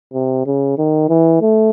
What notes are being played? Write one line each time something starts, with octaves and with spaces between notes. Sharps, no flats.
C3
C#3
D#3
E3
A3